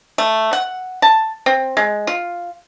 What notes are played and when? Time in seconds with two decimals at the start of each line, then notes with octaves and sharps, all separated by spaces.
0.18 A3
0.53 F#5
1.02 A5
1.46 C4
1.77 G#3
2.07 F4